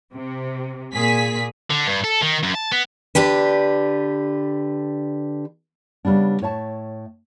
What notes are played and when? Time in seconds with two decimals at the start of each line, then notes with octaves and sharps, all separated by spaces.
0.13 C3
0.94 A#2 G#4 B6
1.70 D3
1.87 G2
2.04 A4
2.22 D#3
2.43 F#2
2.55 A5
2.72 B3
3.15 D3 D4 G4 B4
6.05 C#3 G3 B3 D4
6.42 A2 C#5 E5 A5